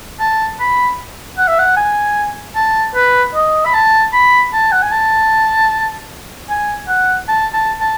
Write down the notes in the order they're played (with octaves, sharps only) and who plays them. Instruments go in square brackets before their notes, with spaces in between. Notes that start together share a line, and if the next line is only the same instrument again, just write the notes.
[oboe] A5
B5
F#5
E5
F#5
G#5
A5
B4
D#5
B5
A5
B5
A5
F#5
G#5
A5
G#5
F#5
A5
A5
A5